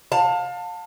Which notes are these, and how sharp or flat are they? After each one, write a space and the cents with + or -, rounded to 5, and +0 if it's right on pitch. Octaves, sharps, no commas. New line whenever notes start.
F5 +30 A5 +25